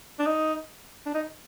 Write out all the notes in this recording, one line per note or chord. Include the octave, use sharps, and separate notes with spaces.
D4
D#4
D4
D#4